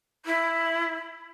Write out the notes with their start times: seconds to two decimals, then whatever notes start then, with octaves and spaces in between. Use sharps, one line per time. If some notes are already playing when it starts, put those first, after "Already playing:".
0.25 E4